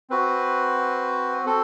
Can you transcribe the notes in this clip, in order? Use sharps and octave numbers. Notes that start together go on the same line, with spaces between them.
C4 F#4 B4
C4 A4